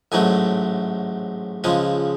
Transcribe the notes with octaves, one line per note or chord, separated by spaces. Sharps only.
A1 G#2 F#3 A3 G#5
C#2 C#3 F3 G#3 G#5